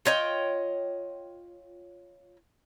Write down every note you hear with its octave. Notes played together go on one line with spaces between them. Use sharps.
F4 C#5 D#5 G5